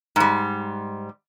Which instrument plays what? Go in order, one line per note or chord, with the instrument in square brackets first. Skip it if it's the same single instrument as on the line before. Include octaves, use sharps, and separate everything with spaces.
[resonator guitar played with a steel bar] G#2 G3